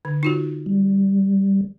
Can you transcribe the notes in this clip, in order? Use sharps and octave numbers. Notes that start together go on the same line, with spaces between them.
D3
D#4 F4 F#4
G3